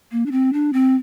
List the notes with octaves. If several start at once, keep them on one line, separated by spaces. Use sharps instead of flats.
A#3
D4
C4
D4
C4